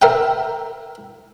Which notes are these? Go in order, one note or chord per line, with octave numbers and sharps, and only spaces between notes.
A#4 E5 G5